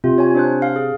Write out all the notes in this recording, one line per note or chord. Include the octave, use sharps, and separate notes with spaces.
C3 F4
C#5 G#5
D4 C5 F#6
F5
G#4